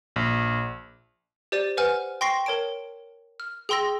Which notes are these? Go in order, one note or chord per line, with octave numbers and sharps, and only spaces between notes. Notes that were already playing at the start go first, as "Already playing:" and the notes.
A#1
G4 C5 D5 A6 D#7
B4 C5 F#5 G#5 F6
G5 C6 C#6 A#6 C7
A#4 C#5 A5 D7
F6
G#4 G5 C6 E6 A#6